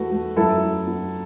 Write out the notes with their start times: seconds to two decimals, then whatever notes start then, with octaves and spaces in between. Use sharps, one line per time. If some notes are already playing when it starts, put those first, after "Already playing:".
Already playing: E2 A3 F#4 B4
0.11 A3
0.36 F#2 E4 A4
0.62 E4
0.87 B3